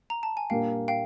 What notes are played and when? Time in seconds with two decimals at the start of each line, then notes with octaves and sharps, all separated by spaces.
0.10 A#5
0.23 A5
0.37 G#5
0.50 A#2 G3 A#3 D4 F5 G5
0.88 F5 G5